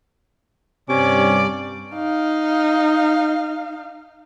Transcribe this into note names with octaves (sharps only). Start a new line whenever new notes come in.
G2 C3 C#4 D5 D6
D#4 F5